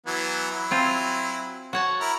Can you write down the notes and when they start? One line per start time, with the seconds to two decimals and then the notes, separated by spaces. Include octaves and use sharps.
0.07 E3 F#3 B3
0.51 F#3 E4
0.71 C4 F4 G#5
1.73 F#4 C#5 A5
2.01 E4 A#4